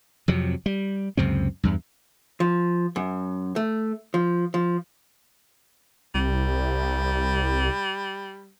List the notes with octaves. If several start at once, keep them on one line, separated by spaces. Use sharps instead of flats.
F2 C3 F#3
G3
C#2 F#2 C3 C4
E2 G2
F3
F#2
A3
F3
F3
C2 G3